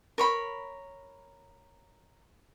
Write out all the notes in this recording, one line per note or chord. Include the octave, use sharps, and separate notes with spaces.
A#4 C#5 B5